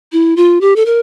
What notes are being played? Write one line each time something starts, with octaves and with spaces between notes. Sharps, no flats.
E4
F4
G4
A4
A#4